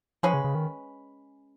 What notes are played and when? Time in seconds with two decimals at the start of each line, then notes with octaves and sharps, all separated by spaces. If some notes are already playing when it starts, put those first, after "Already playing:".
0.23 F3 G#3 C#4 G#4 B4
0.34 C#3
0.44 C#3
0.55 D#3